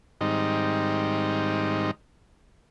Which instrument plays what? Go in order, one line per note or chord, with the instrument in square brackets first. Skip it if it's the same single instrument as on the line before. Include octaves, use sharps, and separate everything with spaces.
[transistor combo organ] G#2 D#3 G3 C4 D#4